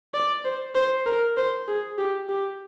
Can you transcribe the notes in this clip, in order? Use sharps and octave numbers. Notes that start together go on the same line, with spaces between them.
D5
C5
C5
A#4
C5
G#4
G4
G4